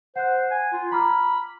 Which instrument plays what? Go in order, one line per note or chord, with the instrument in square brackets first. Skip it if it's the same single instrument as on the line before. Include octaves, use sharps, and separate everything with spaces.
[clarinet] C5 [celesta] F#5 F#6
[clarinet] G#5
F4
[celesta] A#5 D6 F6 [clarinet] B5